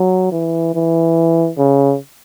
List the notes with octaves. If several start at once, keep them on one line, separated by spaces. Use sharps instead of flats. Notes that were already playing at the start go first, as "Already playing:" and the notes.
Already playing: F#3
E3
E3
C#3